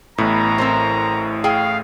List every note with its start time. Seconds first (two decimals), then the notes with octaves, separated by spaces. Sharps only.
0.18 A1 A2 B3 A#5
0.58 C4 A#4 C5
1.44 G#4 F5 G5